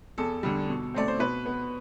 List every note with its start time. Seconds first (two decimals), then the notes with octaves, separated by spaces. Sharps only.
0.18 E2 A4
0.43 D3 G3
0.69 B2
0.94 A3 C4 D5
1.08 C5
1.19 B2 B4
1.46 B3